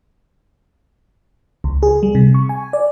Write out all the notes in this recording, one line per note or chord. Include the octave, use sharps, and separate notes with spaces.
C#2
G#4
G3
C3
C#6
G#5
D5